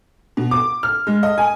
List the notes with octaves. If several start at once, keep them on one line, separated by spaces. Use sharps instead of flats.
B2
D6
F6
G#3
D#5
G#5